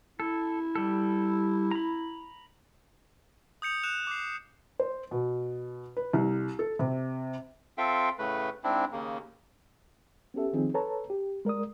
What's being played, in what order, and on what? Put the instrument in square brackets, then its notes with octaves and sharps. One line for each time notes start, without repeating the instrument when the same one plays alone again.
[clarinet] E4 [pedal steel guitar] A4
[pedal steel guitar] G3 A4
A#5 B5
[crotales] D#6 G6 C#7 F7
F#6 E7 F7
D6 C7
[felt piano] C5
B2
B4
C2
A4
C3
[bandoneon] C4 F4 A4 E5 F5 G5
A2 C#3 A3 B4
G#2 C4 D4 E4
D#2 C#3 A#3
[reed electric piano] B3 C#4 G4 A4 E5
D#3 F3 C4 D#4 F4 G#4
A4 B4 C#5 A5 A#5
G4
G#3 A#4 D5 D#6